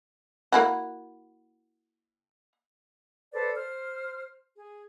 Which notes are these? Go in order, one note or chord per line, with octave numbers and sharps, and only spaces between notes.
A#3 E4 F#4
A4 B4 C5 D5
C5 F6
G#4